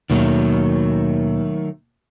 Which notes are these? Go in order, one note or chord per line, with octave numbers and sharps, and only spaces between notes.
D#2 B2 D#3 F#3 A3 A#3